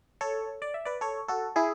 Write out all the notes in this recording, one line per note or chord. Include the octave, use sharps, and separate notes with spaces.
A4 C#5
D5
E5
B4 D5
A4 C#5
F#4 A4
E4 G#4